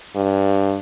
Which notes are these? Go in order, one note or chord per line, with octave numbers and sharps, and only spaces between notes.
G2